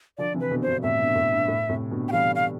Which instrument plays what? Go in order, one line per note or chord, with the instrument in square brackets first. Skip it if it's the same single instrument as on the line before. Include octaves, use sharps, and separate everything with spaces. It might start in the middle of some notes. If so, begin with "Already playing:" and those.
[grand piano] D3 F3 [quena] D5
[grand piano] C3 E3
[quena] B4
[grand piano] B2 D3
[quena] C5
[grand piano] G2 B2
[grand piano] A2 C3 [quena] E5
[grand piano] G2 B2
A2
G2
A2
A2 C3
B2 D3
[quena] G5
[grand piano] E3 G3 [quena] F5
[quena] F5